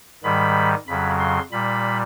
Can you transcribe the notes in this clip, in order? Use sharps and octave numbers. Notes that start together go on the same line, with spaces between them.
G#2 D#3 G3 B5
F2 C#3 F#3 B5
C6
A#2 G3 B5